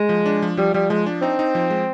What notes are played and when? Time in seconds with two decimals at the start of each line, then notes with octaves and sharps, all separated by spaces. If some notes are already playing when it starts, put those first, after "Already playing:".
Already playing: G#3
0.09 F3
0.26 D4
0.42 F3
0.57 F3 G3
0.74 F3 G3
0.90 F3 G#3
1.06 D4
1.22 C4 D#4
1.39 D#4
1.55 F3
1.70 G#3